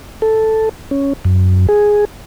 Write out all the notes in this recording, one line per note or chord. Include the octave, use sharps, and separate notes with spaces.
A4
C#4
F#2
G#4